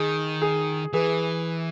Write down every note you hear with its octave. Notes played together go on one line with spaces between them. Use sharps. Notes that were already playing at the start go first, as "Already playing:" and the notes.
Already playing: D#3 G#4
G#4
E3 G#4 B4